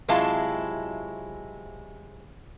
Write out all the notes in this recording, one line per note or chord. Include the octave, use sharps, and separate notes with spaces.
C3 F#3 G#3 E4 F4 A5